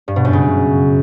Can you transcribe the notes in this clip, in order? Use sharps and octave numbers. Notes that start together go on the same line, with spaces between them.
G2
B2
F#2
C#3